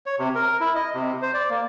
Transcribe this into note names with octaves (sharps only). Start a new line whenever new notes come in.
C#5
C3
A#4
E4
D#5
C3
C5
D5
A#3